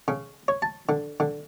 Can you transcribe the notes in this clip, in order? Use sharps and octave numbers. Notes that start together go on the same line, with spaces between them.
C#3
C#5
A5
D3
D3